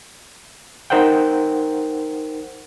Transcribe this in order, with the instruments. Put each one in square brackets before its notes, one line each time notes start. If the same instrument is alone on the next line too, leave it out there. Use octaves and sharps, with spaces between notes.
[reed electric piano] D#4 A#4 C5 F#5 G5